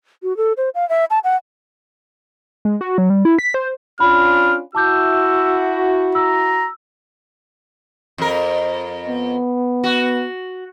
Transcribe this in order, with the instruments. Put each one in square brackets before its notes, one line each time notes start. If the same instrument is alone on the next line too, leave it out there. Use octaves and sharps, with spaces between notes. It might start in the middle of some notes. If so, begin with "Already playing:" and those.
[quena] F#4
A4
C5
F5
E5
A5
F#5
[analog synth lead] G#3
F#4
F#3
G3
E4
B6
C5
[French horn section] C#4 D4 F4 [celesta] B5 [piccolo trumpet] F6
[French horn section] E4 F#4 [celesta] A5 D6 G6 [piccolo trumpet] E6
[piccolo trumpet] A#5 [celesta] E6
[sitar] F2 A#4
[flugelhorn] B3
[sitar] F#4